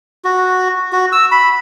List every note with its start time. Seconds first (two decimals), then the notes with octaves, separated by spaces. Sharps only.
0.25 F#4
0.92 F#4
1.12 E6
1.31 B5